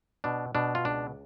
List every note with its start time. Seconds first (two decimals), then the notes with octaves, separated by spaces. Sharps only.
0.24 B2 D4
0.55 B2 D4
0.75 F4
0.85 C#2 D4